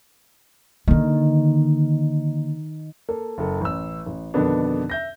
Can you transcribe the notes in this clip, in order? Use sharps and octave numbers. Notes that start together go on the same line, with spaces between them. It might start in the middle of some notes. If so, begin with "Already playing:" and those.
D3 D#3 A#3
A#3 A4
F#1 A4
A1 E6
A1
F2 B2 D3 D#3 B3 D4
E5 G6 A#6